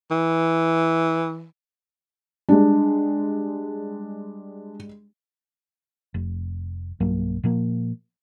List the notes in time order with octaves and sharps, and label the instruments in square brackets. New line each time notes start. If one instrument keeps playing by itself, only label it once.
[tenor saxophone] E3
[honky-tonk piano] G3 G#3 [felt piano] D4
[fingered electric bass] F1
B1 G2 F#3 A#3
A#2 F3 A#3